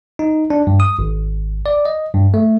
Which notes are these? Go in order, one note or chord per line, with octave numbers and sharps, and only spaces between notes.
D#4
D4
G2
D#6
G#1
D5
D#5
G2
A3